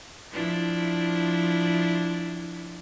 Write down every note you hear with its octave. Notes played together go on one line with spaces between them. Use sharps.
F3 D4 E4